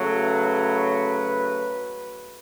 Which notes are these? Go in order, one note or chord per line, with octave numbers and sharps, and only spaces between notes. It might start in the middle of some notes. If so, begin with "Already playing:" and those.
Already playing: C#3 F#3 A3
B4